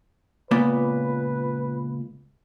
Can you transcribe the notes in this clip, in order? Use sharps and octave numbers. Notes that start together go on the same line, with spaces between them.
C#2 A#2 B3 B4